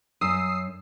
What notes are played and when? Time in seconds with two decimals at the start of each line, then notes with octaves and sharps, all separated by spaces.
0.21 F#2 D#6 E6 C7